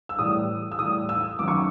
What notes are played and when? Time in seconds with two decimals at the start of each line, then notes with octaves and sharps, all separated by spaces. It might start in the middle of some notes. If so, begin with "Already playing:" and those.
0.09 E6
0.19 A2 E3 G3 D#6
0.72 E6
0.79 A2 E3 G3 D#6
1.09 E6
1.39 F#2 D#3 F#3 D6
1.48 C#6